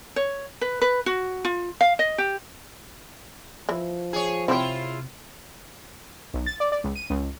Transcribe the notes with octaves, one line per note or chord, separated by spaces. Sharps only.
C#5
B4
B4
F#4
F4
F5
D#5
G4
E3 F3 E4
G#4 C#5
C3 C4 E4 F4 G4
B1
A6
D5
D5
C#2
D#7
C#2